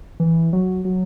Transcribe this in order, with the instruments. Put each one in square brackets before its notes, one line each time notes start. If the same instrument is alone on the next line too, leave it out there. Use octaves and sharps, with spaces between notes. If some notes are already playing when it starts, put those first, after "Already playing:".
[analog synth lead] E3
F#3
F#3